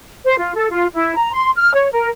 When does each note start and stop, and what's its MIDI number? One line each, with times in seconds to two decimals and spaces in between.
0.25 0.37 72
0.38 0.55 65
0.56 0.70 69
0.71 0.86 65
0.94 1.15 64
1.16 1.31 82
1.32 1.50 84
1.56 1.73 89
1.74 1.89 73
1.92 2.09 70